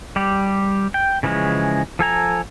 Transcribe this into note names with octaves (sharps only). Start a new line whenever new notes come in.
G3 G4
G5
C#3 E3 F3 G#3 C#4
F3 A4 G#5 A#5